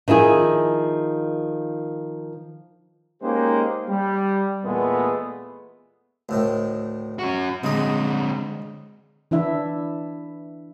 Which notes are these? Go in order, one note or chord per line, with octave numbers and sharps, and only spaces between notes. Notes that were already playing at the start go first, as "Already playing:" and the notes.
D#3 F3 E4 G#4
G#3 A#3 C#4 D#4 G4 C5
G3
E2 A#2 G#3 A3 B3
D2 A2 D#3
C#4 F#4
D3 G#3 C4 D#5
E3 D4 E4 E5